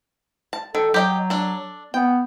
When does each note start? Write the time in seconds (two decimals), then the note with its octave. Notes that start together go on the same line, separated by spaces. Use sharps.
0.53 A5
0.75 D#3 A4
0.94 F#3 G4 D#5 G5
1.30 D4 A4
1.94 B3 G5